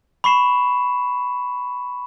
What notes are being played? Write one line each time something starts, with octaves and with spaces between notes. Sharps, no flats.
B5 C#6 C7 E7